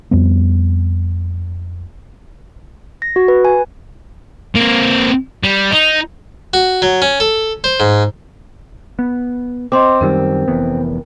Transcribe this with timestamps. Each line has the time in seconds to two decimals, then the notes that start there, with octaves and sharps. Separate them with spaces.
0.11 F2 G3 B3
3.02 A#6
3.16 F#4
3.28 B4
3.45 G#5
4.55 A#3 C4
5.44 G3
5.71 D#4
6.54 F#4
6.82 F#3
7.02 C#4
7.20 A4
7.64 C5
7.80 G#2
8.99 B3
9.72 C4 D#5 C6 D6
10.01 F#2 D#3 G3 A#4
10.48 F1 E3 B3